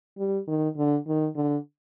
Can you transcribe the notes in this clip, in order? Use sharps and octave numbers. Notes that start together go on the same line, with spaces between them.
G3
D#3
D3
D#3
D3